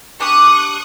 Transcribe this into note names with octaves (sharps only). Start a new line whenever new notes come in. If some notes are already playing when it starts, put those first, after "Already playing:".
D4 G4 C#6 D#6 F#6